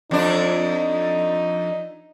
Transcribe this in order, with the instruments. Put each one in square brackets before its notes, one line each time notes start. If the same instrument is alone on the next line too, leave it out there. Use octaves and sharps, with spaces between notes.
[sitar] F2 D4 [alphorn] D#4